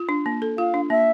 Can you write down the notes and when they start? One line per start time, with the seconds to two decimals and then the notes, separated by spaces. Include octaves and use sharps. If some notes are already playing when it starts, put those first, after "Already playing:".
Already playing: F4
0.09 D4
0.26 A#3
0.42 A4
0.58 F4 F5
0.74 D4
0.90 A#3 E5